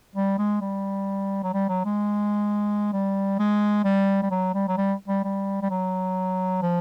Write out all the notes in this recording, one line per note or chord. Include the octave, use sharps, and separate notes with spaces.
G3
G#3
G3
F#3
G3
F#3
G#3
G3
G#3
G3
G3
F#3
G3
F#3
G3
G3
G3
G3
F#3
F3